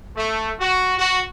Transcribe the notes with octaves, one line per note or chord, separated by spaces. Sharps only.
A3
F#4
F#4